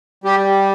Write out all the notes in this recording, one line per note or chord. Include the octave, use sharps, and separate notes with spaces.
G3 G4